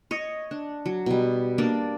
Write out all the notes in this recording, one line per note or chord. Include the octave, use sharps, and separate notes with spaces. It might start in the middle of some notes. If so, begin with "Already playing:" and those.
C#5 D#5
D4
F#3
B2 G3
A#3 D4 D5